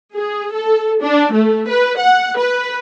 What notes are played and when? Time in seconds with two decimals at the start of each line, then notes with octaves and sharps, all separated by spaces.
0.15 G#4
0.51 A4
1.02 D4
1.32 A3
1.68 B4
1.99 F#5
2.38 B4